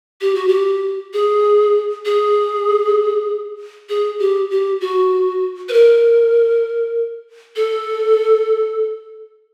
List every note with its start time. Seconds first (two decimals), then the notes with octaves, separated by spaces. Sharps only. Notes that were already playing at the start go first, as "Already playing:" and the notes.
0.21 G4
0.35 F#4
0.48 G4
1.13 G#4
2.06 G#4
3.89 G#4
4.19 G4
4.51 G4
4.81 F#4
5.69 B4
5.73 A#4
7.56 A4